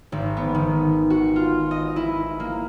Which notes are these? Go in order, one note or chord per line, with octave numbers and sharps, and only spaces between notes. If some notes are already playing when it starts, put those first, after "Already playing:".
G#1
B3
D#3
F#4
F4
D#5
E4
A#3